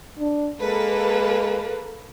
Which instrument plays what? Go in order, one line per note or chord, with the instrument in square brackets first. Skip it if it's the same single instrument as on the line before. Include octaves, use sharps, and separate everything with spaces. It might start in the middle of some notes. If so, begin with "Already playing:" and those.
[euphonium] D4
[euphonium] G#3 [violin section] A#3 A4 B4